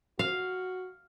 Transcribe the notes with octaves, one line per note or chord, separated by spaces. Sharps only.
F#4 F5